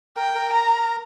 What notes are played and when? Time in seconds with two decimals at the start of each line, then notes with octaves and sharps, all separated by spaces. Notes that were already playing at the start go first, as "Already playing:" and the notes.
0.17 A#4 G5
0.35 A#4
0.53 A#5